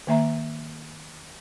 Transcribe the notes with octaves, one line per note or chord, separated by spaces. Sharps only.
D#3 A#3 E5 A#5